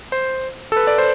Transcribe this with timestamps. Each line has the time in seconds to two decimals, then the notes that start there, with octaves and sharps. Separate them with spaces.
0.12 C5
0.72 A4
0.76 B4
0.87 D5
0.98 C5